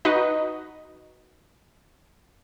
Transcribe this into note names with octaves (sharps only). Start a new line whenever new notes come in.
D#4 F#4 B4 D#5